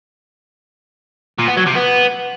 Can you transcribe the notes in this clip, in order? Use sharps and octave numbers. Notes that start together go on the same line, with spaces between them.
A#2
B3
F#3
C3
B3